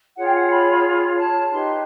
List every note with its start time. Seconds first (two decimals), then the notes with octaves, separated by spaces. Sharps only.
0.16 F4 G#4 C#5 F#5
0.26 G5
0.34 F#5
0.51 B5
1.17 A5
1.51 D#4 G4 B4 C6